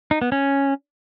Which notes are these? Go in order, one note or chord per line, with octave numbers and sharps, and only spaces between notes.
D#4
B3
C#4